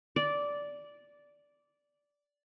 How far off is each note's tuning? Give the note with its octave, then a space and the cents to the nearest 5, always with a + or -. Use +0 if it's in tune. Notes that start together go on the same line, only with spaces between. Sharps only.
D5 -10